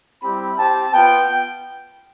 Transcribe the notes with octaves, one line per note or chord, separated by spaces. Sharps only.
G3 C4 E4 G4 B5
C4 G4 A5
B3 F4 G5